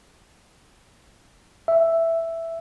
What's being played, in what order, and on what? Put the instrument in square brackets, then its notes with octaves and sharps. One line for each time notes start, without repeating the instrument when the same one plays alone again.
[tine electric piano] E5